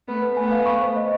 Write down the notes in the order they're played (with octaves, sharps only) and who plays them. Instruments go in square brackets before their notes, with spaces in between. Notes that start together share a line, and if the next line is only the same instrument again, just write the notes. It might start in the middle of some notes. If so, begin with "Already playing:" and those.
[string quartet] A3 B3 [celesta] B4
[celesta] B4
[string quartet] A3 B3 [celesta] G#5
[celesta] F5
C#6
C5
D#5